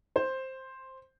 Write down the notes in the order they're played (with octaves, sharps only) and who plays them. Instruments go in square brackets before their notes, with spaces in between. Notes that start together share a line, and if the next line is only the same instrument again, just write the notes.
[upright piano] C5